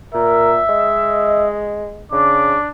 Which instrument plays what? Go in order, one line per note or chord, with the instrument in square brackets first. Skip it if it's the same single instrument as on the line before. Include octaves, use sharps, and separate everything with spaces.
[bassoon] A#2 [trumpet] A#4 [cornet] E5
[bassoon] G#3 [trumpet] D#5
[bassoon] C#3 [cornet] D4 [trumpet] D6